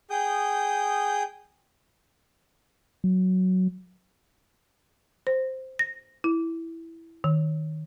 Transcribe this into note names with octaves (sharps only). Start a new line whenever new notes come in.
G#4 G5 D#6 G6
F#3
C5
A#6
E4
D#3